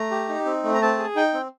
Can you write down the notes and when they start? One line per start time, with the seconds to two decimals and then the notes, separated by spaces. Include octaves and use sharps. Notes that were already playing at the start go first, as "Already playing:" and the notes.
Already playing: A3 A#5
0.11 G4
0.29 D#4
0.45 C4
0.64 A3
0.74 A#5
0.82 C4 A5
0.98 G#4
1.16 D#4 G5
1.34 C4